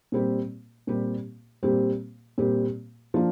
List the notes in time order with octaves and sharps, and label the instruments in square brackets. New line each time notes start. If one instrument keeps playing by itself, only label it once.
[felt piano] A#2 G3 C4 G4
A#2 G3 C4 G4
A#2 G3 C4 G4
A#2 G3 C4 G4
F3 A#3 D4 F4